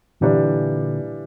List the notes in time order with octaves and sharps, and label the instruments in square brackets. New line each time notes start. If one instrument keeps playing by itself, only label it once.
[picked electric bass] A#2 D3 [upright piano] E3 G3 D4